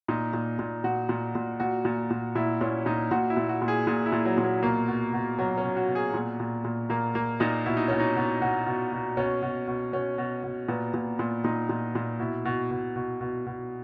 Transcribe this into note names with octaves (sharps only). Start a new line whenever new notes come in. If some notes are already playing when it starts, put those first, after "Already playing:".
A#2 D#4
A#2
A#2
A#2 F#4
A#2
A#2
A#2 F#4
A#2
A#2
A#2 E4
A#2 C#4
A#2 D#4
A#2 F#4
E4
A#2
F#4
A#2
G#4
A#2 G#4
E4
A#2
F#3
A#2
F#3
B2 A#3
B2
B2
B2 F#3
C#4
B2
F#4
B2
G#4
A#2
A#2
A#2
A#2 A#3
A#2 A#3
A#2 D#4
B2 E4
D#4
B2 C#4
D#4
B2
B2 F#4
B2
B2
B2 C#4
B2
B2
B2 C#4
B2
B2
A#2 B3
A#2
A#2
A#2 D#4
A#2
A#2
B2 E4
B2
B2
B2
B2
B2